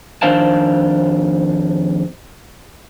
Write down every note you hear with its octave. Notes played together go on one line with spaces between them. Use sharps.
F2 D#3 D4 C5 F5 A5